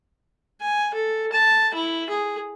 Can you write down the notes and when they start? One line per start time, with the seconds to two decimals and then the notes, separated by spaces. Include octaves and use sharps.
0.61 G#5
0.94 A4
1.32 A5
1.74 E4
2.09 G#4